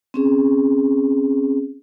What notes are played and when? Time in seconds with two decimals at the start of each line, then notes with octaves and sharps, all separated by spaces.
0.14 C4 C#4 G#4